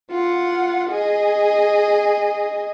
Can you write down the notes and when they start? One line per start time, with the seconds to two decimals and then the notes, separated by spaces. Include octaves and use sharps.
0.10 F4 F#5
0.91 G#4 D#5